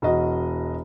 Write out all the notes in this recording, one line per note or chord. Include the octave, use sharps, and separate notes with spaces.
E1 F#4 D#5